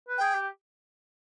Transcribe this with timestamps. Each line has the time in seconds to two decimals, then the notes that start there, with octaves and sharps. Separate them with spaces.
0.09 B4
0.18 G#4 G5
0.34 G4